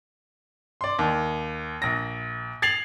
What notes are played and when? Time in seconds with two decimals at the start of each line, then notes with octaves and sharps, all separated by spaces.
0.81 D5 C6
0.99 D#2
1.82 A#1 A#6
2.62 G#6 A6 C7 F7 F#7